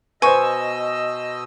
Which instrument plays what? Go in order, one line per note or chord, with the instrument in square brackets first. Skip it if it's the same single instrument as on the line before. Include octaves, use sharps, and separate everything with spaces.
[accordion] B2 D#5 E6 [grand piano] B4 C5 [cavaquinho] G#5 C#6